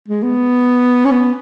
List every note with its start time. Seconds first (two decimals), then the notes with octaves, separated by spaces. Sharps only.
0.08 G#3
0.23 B3
1.05 C#4
1.11 B3